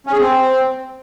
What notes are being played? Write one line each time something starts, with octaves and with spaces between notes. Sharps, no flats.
C#4
G#4
C4